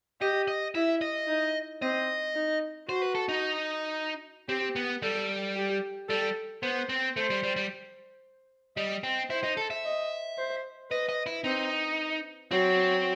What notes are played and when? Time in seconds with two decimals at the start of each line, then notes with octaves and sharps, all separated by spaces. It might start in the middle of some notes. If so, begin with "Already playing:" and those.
0.21 G4 D#5
0.48 D#5
0.75 E4 E5
1.01 D#5
1.27 D#4
1.82 C4 D#5
2.36 D#4
2.88 F#4 C5
3.02 B4
3.15 A4
3.29 D#4
4.49 C4 G4
4.76 B3
5.02 G3 A4
5.56 G4
6.09 G3 A4
6.62 B3 C5
6.89 C4
7.16 A3 C5
7.30 G3
7.43 G3
7.56 G3
8.77 G3 D#5
9.03 C4
9.30 E4 C5
9.44 D#4
9.57 A4
9.70 E5
9.85 D#5
10.38 C5
10.91 B4 D#5
11.09 D#5
11.26 E4
11.44 C4 D#4
12.51 F#3 C4